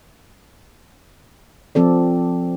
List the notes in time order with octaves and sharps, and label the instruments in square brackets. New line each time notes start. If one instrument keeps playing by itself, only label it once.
[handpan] F3 C4 A4 D5